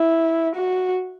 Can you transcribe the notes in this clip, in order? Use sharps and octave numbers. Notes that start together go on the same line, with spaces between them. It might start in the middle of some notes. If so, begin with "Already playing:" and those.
Already playing: E4
F#4